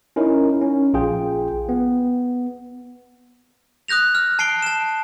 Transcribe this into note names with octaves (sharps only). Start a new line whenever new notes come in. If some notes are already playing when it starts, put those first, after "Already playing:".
C#4 D#4 E4 A#4
C#4
A#1 F4 G#4 G5
B3
D#6 F#6 G6 A#6 F7
F6
A5 C7 D7 G7
A5 E7